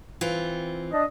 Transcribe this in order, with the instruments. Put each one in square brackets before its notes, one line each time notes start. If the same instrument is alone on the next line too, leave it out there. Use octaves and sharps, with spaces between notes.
[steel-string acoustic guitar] E3 C4 F4
[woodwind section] D4 D#5